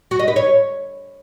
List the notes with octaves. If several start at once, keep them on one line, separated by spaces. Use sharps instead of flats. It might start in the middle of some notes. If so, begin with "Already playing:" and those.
F#4
D#5
B4
C#5